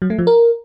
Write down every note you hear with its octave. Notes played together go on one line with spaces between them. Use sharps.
F#3
A3
F3
A#4